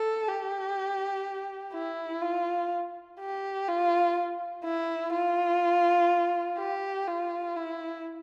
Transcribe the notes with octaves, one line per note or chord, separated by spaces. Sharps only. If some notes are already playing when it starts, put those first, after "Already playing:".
Already playing: A4
G4
E4
F4
G4
F4
E4
F4
G4
F4
E4